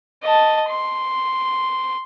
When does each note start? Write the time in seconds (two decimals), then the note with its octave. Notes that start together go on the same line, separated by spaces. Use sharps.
0.23 D#5 A5
0.69 C6